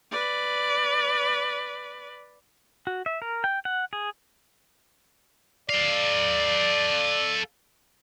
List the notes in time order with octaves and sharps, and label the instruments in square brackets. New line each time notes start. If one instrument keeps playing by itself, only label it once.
[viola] B4 D5
[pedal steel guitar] F#4
E5
A#4
G5
F#5
G#4
[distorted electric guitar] A4 F5 [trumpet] D5